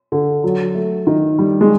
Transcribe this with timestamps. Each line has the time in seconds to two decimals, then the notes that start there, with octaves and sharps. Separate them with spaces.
0.12 D3
0.44 F#3
0.75 A3
1.07 D#3
1.39 G3
1.61 G#3